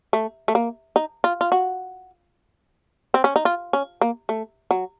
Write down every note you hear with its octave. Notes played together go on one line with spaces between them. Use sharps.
A3
A3
A#3
D#4
F4
F4
F#4
C4
C#4
D#4
F4
C#4
A#3
A3
F#3